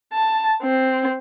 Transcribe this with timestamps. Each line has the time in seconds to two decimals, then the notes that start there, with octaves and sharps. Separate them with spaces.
0.14 A5
0.63 C4